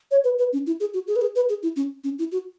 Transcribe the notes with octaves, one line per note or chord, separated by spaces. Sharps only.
C#5
B4
B4
C#4
E4
G#4
F#4
G#4
B4
G#4
B4
G#4
E4
C#4
C#4
E4
F#4